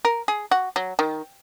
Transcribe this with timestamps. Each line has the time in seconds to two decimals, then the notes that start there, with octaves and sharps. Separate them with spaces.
0.05 A#4
0.28 G#4
0.51 F#4
0.76 F#3
0.99 D#3